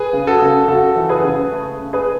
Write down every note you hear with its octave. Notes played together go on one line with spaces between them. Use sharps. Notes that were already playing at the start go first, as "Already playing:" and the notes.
Already playing: G#4 B4
C#3
F#4 A4
C#3
C#3 F#4 A4
E3
G#4 B4
C#3
A3
C#3
G#4 B4